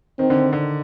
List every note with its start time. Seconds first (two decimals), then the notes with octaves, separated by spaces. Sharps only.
0.19 D#3 C4
0.30 D3
0.53 D3